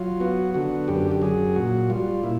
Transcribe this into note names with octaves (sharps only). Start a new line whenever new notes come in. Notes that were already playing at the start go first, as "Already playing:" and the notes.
Already playing: F#3 F4
B3 F#4
D3 F#4
F#2 G4
G4
F#3 G#4
A#2 F#4
G3 F4
A#2 E4